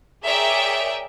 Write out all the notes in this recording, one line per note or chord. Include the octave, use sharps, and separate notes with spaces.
G#4 A#4 C#5 D5 E5 G5